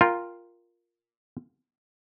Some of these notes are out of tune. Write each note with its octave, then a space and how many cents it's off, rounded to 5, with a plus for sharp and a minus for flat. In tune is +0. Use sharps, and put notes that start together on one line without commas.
F4 +0 A#4 +0 G5 +5